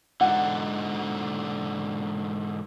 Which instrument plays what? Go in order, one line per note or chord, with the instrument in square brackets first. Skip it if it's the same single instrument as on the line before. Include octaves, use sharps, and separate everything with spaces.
[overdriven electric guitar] G#2 D3 [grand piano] F#5